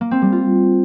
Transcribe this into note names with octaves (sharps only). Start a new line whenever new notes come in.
A#3
C4
G3
F4